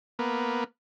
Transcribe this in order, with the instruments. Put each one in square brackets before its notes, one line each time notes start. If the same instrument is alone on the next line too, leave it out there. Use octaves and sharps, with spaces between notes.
[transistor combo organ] A#3 B3